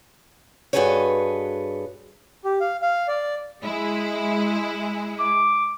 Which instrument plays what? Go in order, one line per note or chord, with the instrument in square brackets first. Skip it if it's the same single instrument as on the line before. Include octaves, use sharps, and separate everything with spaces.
[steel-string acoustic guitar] G2 F#4 G#4 A4 B4 C#5
[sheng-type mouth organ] G4
F5
F5
D5
[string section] G#3 E4 G#4
[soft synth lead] D6